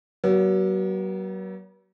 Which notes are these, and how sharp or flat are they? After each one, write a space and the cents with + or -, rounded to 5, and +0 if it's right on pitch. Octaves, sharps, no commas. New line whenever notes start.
F#3 +35 B3 -45